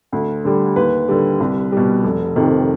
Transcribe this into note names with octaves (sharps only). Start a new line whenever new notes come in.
D2
D3 G3
D#2 B4
D3 G3
C2
B2 G3
F1
F2 C3 D#3